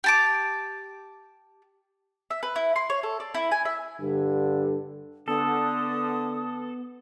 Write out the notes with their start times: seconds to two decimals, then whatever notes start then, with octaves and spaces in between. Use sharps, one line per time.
0.04 G4 A5 D6
2.30 E5
2.43 B4
2.56 E4
2.76 C6
2.90 C#5
3.03 A4
3.20 D5
3.34 E4
3.52 G#5
3.65 E5
4.00 G2 D3 G3
5.28 D3 B3 A4 D#6